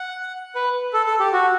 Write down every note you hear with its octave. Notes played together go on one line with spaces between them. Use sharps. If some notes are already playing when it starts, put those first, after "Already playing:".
Already playing: F#5
B4
A4
A4
G4
F#4